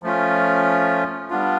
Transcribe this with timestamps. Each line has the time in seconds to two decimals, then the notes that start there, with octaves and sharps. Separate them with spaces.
0.03 F3 A3 C#4 F4
1.30 G3 B3 D4 F4